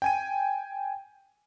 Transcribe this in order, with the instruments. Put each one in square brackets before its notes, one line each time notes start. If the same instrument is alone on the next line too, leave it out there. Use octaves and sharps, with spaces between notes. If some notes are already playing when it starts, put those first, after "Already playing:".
[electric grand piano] G5 G#5 D#7